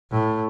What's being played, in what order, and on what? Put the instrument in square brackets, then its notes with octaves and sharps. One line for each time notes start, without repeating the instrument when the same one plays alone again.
[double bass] A2